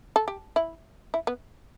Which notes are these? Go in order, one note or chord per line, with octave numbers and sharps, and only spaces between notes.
A4
G4
E4
E4
B3